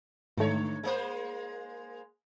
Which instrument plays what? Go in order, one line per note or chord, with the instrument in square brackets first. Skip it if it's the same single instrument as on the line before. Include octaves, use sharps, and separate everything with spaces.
[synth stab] G#2 A3 [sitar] D3 C#5
[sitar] G#3 A#3 C5